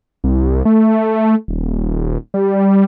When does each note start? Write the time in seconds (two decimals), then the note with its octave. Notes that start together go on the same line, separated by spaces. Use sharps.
0.24 C2
0.65 A3
1.48 D#1
2.34 G3